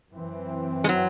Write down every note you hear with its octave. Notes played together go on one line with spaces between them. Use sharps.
F#2 E3 C4
G#3
F#3